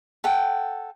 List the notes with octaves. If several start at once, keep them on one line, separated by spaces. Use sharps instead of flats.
A4 F#5 G5